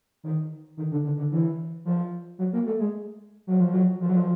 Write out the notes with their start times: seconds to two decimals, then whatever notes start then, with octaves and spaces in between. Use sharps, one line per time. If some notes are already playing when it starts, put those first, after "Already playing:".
0.24 D#3
0.77 D#3
0.91 D3
1.04 D3
1.18 D3
1.32 E3
1.85 F3
2.39 F#3
2.53 A#3
2.66 A3
2.80 G#3
3.47 F#3
3.60 F3
3.73 F#3
4.00 F3
4.09 F#3
4.16 F3